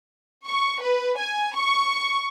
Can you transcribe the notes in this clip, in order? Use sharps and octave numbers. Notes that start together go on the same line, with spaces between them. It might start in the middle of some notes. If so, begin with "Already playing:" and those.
C#6
B4
G#5
C#6